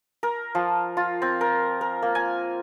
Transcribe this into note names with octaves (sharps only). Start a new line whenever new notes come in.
A#4
F3
F4
C4
A#4
A#4
A#3
G#5